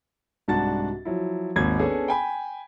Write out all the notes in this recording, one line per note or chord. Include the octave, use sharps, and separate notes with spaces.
C2 G#2 D4 F#4 A5 A6
F3 F#3 E4
G#1 D#2 G#6
B3 C#4 D4 G#4 A4
G5 G#5 B5